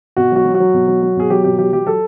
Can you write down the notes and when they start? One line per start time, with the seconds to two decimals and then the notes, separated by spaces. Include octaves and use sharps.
0.17 B2 F#4
0.32 F#3 F#4
0.45 F#3
0.54 F#4
0.60 F#3
0.74 B2
0.88 F#3
1.02 F#3
1.17 B2 G#4
1.30 F#3 G4
1.44 B2 G4
1.59 F#3 G4
1.73 F#3 G4
1.87 F#3 A4